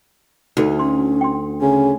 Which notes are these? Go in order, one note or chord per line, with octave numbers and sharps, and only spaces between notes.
D2 D#4 F#4 A4
C#4 C6
G5 C6
C#3 G#5